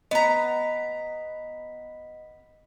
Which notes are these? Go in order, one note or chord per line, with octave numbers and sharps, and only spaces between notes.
B3 D#5 A#5 B6